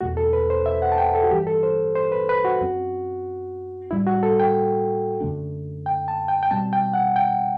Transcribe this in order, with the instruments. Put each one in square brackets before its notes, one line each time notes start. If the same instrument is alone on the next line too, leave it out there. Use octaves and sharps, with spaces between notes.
[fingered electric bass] E2 B2 A3 [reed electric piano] F#4
[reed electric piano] A4
B4
C5
E5
F#5
A5
G5
A4
F#4
[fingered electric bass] G2 E3 G3 [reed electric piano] G4
[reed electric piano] A4
C5
C5
B4
B4
F#4
[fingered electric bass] F#2 F#3 C4
[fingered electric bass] A2 G3 D4 [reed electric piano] E4
[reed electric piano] F#4
A4
G5
[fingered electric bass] F#2 D3 A3 D4
[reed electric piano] G5
A5
G5
G5
[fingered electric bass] B2 G3 C4 [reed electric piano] A5
[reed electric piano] G5
F#5
G5